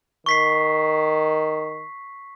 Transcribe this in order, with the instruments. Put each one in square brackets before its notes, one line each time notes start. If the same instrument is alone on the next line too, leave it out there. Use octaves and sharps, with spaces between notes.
[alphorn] D#3 [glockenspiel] C#6 B6 C7